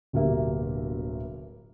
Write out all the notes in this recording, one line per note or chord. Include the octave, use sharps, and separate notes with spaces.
D1 G1 B2 A#3 G4 E5